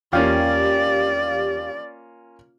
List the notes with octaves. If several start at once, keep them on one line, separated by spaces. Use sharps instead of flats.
E2 A#3 C#4 F4 G4 D5 F5